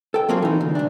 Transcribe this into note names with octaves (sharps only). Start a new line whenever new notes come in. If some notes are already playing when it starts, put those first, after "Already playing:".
A4 G5
F#3 A#3 C4 F4 G#4
E3 D#4
D2
C2 D4